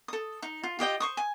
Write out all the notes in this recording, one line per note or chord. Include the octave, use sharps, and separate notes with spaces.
A4 D#6
D#4
F4
F4 G4 D#5 G5
C5 C#6 D#6
G#5